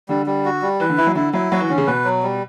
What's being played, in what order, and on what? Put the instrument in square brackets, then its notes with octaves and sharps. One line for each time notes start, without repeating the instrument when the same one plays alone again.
[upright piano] D3 [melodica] G3
[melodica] G3
F#4
G3
[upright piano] E3 [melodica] B4
[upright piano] D3
[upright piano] E3 [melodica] E4
[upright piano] F#3
[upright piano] D3 [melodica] E4
[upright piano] F#3 [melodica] E4
[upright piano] F#3 [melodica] F#4
[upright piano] E3
[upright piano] D3 [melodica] C#4
[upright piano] C#3
[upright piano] B2 [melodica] B4
[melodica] F#3
G3